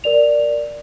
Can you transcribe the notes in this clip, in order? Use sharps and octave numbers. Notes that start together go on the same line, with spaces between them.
A#4 D5 F7